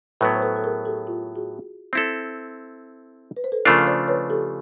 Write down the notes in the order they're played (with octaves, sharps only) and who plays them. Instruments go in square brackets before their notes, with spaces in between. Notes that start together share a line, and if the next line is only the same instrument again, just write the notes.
[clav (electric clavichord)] A2 F#3 B3 [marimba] A4 B4
[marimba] C5
A4 B4
A4
G#4 A#4
G4 A4
F4 G4
F#4 G#4
[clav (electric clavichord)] C4 E4 A4
[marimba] B4
C5
A4 B4
[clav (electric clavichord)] C#3 F3 A3 D4 F4 [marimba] A#4 C5
[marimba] C5 D5
B4 C#5
G4 A4